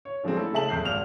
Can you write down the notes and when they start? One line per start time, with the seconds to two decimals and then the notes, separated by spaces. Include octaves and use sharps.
0.05 C#5
0.24 D3 F3 F#3 G#3 C4
0.36 A3 E4 A4
0.53 C#3 A3 E5 A5 F#7
0.69 D#1 F2 G6 C7
0.85 G#1 F6 F7